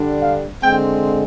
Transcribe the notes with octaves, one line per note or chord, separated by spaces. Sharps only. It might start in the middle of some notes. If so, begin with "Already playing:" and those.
Already playing: D3 G3 D4
F5
D3 G#3 C4 G5